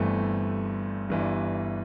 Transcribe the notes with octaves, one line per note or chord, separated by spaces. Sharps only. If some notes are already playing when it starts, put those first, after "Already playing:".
Already playing: G1 G2 E3 A3 C4
G1 G2 E3